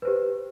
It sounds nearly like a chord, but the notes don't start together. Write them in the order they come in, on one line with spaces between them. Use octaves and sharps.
B4 C5 G4